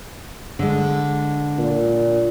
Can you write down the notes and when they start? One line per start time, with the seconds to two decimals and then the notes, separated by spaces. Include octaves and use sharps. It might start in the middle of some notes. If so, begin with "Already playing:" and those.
0.59 D3 G#3
1.58 A#2